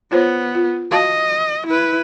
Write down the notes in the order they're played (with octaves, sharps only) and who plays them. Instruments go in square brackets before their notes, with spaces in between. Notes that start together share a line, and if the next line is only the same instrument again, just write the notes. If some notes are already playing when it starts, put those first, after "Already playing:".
[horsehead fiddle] B3 [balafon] F4 C5 C#5
[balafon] F4
[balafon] F#4 F5 A5 [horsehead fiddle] D#5
[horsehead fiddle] E4 B4